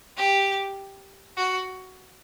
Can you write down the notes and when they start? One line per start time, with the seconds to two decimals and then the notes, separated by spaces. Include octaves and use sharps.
0.17 G4
1.37 F#4